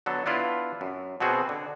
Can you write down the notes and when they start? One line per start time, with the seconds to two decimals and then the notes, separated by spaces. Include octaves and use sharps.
0.06 D3 F#3 B3 A4
0.26 B3 D4 E4 F4 B4
0.81 F#2
1.20 B2 B3 C4 F#4 G#4
1.49 D3